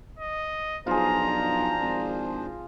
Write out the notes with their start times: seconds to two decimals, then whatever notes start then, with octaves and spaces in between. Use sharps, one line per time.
0.19 D#5
0.86 B1 F3 D4 F4 G#4 C5 A#5
1.81 G#1